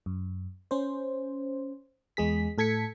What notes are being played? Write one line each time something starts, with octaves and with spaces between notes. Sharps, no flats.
F#2
C#4 C5
E2 G#3 G#4 B6
A2 A4 G#6 B6 C#7